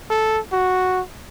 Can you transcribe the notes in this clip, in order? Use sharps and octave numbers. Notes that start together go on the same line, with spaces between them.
A4
F#4